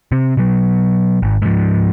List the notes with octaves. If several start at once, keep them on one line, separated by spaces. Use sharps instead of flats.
C3 C4
B2 F#3
G#1
G#2 F3